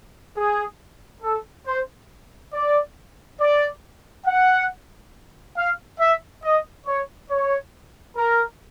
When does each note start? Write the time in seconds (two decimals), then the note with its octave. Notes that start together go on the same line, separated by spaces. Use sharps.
0.37 G#4
1.23 A4
1.67 C5
2.54 D5
3.40 D5
4.27 F#5
5.57 F5
6.00 E5
6.44 D#5
6.87 C#5
7.31 C#5
8.17 A#4